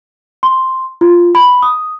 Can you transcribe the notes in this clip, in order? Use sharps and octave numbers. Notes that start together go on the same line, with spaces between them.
C6
F4
B5
D#6